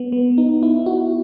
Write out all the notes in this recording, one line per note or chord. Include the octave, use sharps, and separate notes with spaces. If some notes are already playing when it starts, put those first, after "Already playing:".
Already playing: B3
B3
D#4
E4
F#4